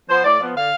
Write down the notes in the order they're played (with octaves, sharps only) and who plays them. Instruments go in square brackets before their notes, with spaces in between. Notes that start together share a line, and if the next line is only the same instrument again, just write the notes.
[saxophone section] F3 B3 C5
A2 D5
F3 B3
D3 F5